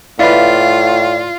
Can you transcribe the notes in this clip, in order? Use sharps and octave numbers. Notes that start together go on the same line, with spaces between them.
A2 E4 F4 B4 D5 F5